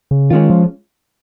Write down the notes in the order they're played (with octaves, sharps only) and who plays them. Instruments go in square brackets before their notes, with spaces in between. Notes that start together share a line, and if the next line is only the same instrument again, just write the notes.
[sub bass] C#3
[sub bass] D#3 [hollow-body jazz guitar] G#3 C#4 F4
[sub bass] F3